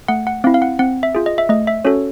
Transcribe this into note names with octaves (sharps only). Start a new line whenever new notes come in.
A3 F#5
F#5
C4 E4 F5
F5
F#5
C4 F#5
E5
F4 G#4
D#5
E5
A3 D#5
E5
C#4 F#4 A4 C#5